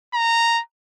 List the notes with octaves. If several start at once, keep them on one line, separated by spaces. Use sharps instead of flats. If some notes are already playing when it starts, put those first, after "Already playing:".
A#5